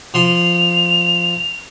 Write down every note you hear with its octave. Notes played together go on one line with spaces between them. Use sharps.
F3 C6 F7